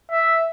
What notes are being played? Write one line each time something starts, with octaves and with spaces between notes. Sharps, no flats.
E5